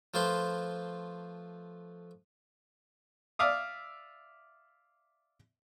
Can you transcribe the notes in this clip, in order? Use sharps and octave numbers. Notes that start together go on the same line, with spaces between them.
F3 A3 F4 B4 C5 C6
D5 E5 F5 D#6